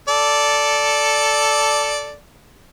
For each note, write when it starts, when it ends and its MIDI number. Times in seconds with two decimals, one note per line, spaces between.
0.08 2.16 69
0.08 2.16 74